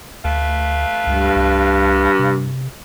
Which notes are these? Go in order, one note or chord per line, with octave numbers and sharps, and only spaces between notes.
D2 A3 B4 F5
C#2 G2
C2
C3